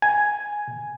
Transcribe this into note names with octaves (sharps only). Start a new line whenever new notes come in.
G#5